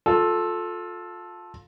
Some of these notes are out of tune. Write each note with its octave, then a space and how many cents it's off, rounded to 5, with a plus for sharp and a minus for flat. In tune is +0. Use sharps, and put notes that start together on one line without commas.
F4 +25 A4 -5